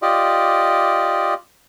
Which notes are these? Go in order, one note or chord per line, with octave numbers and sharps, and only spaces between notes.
F4 G4 D5 D#5